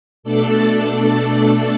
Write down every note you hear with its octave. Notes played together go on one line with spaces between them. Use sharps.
B2 A3 D4 A4 D5
A4 D5